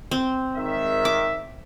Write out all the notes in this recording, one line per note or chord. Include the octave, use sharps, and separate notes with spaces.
C4
G#1 D#3 E5
D6